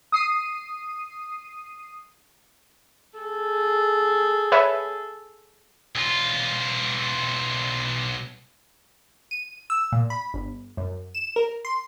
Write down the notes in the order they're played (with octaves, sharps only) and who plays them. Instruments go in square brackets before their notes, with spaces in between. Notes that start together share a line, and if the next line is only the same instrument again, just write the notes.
[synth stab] D#6 C7 D#7
[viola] G#4 A4
[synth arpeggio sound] B4 C#5 E5
[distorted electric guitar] B1 F4
[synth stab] D#7
E6
A#2
B5
G1
F#2
E7
A#4
C6